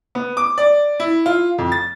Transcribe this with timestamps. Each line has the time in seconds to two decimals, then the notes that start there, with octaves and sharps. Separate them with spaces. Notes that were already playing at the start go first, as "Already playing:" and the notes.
0.15 B3
0.37 D6
0.58 D5
1.00 E4
1.26 F4
1.58 F2
1.72 A6